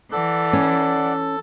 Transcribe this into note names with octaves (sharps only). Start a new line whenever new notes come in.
E3 A4 D5 F#5
C#4